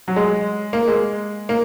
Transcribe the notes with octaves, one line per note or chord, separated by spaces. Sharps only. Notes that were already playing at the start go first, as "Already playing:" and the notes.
F#3
G#3
A#3
G#3
A#3